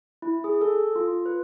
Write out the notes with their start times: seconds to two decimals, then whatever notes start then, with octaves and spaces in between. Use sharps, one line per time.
0.22 E4
0.44 G#4
0.61 A4
0.96 F4
1.26 B4